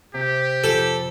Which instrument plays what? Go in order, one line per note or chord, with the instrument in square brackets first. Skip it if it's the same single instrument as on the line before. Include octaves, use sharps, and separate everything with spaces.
[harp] C3 [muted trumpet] G4
[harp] F2 [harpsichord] A4